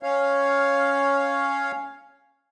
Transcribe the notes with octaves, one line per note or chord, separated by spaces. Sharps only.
C#4 C#5 F5